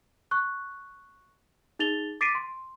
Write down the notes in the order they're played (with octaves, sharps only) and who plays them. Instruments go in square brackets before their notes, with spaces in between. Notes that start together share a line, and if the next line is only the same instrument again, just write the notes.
[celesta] C#6 F#6
D#4 G#4 A6 F7 G7
D6 A6 B6 C7 D7 D#7
C6